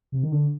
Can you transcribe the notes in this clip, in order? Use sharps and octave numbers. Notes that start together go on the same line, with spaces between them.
C3
D#3
D3